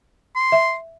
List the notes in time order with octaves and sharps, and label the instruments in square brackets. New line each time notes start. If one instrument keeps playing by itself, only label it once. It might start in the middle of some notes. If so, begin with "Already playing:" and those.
[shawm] C6
[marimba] E5